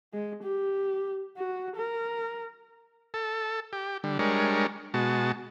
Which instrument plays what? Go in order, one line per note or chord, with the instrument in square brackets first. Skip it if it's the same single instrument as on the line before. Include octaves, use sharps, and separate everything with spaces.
[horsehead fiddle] G#3
G4
F#4
A#4
[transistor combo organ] A4
G4
D3 G3
G3 G#3 D4 A#4 C#5
B2 G#3 F#4 A5